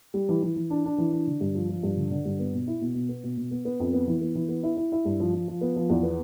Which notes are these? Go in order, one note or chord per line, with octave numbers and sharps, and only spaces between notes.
G3
E3
E3
E3
D4
D4
E3
D4
D3
G2
F3
F3
G2
D3
D3
G2
B3
B2
E4
B2
B2
B3
B2
B2
B3
B3
F2
B3
E3
B3
E3
B3
E4
E4
E4
G2
F3
F3
F3
B3
F3
E2
B3